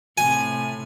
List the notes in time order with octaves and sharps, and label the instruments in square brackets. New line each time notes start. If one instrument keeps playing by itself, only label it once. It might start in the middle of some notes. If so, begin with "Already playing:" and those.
[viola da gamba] A2 C3 [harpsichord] G#5